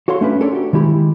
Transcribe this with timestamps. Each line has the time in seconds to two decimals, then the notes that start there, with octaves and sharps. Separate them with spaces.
0.08 F#4 A4 C#5 F5 C6
0.21 A3 C#4 D4 B4
0.40 C#4 D4 A4 A#4 C#5 D5
0.53 F#4 G4
0.73 D#3 G#3 E4 G4 B5